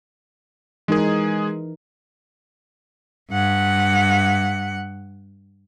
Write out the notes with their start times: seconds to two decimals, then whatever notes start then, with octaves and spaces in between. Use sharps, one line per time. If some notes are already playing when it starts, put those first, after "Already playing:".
0.88 E3 G#3 D#4 G#4 A#4
3.31 G2 F#5